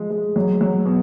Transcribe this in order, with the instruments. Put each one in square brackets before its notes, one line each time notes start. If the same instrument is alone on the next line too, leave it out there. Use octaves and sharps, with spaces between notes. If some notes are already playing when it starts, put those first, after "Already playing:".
Already playing: [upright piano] F3 G#3
G#3
F#3
F#3
B2